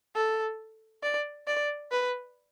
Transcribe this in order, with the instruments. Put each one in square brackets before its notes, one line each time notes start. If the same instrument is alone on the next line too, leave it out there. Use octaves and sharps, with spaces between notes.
[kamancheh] A4
D5
D5
B4